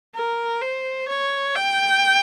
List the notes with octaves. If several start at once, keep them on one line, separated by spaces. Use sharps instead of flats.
A#4
C5
C#5
G5